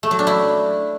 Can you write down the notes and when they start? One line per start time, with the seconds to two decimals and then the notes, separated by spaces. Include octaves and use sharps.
0.03 A3
0.11 F#3
0.19 D4
0.27 E4